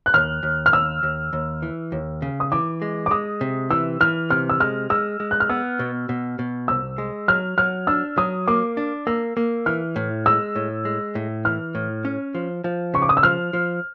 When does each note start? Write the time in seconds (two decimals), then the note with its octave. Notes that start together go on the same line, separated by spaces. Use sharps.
0.06 F#6
0.14 D#2 F6
0.43 D#2
0.66 F6
0.73 D#2 E6
1.03 D#2
1.33 D#2
1.62 E3
1.92 D#2
2.22 C#3
2.40 D#6
2.52 E3 D6
2.82 G#3
3.06 D6
3.11 G#3 D#6
3.41 C3
3.70 E3 E6
4.00 E3 F6
4.30 C3 F6
4.49 E6
4.60 G#3 F6
4.90 G#3 E6
5.20 G#3
5.31 F#6
5.40 F6
5.49 B3 E6
5.79 B2
6.09 B2
6.39 B2
6.68 C2 E6
6.98 G#3
7.28 F#3 F6
7.58 F#3 F6
7.87 D4 E6
8.17 F#3 D#6
8.48 A#3 D6
8.77 D4
9.07 A#3 E6
9.37 A#3
9.66 E3 F6
9.96 A2
10.26 G#3 E6
10.55 A2
10.85 G#3
11.15 A2
11.45 E3 F6
11.75 A2
12.05 C#4
12.35 F3
12.64 F3
12.94 C#3 C#6
13.02 D6
13.09 D#6
13.17 E6
13.23 F3 F6
13.53 F3